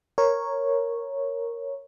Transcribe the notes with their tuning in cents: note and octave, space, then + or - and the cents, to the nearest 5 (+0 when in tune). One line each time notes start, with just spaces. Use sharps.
A#4 +0 C#5 -5